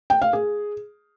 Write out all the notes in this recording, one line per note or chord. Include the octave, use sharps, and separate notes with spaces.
G5
F5
G#4